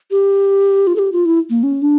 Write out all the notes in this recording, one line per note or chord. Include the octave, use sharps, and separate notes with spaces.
G4
F4
A4
G4
F4
E4
A#3
C#4
D4